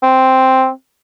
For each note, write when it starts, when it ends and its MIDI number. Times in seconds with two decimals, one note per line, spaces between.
0.03 0.69 60